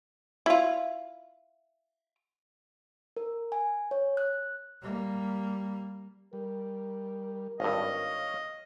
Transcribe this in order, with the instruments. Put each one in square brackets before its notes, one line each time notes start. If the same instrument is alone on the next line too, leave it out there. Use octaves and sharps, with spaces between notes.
[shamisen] E4 F4
[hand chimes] A#4
G#5
C#5
F#6
[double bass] G3 A#3
[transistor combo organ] G3 [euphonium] A#4
[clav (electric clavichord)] G#1 G2 [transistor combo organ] C#5 F5 [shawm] D#5